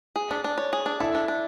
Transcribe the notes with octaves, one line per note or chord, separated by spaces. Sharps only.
G#4
D4
D4
C#5
G#4
D4
E4 A4
D4
D4